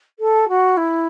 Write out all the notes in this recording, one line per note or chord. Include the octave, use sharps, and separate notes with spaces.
A4
F#4
E4